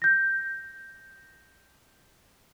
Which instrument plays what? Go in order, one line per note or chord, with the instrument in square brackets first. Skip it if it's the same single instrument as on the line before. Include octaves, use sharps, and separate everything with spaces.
[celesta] G6 A#6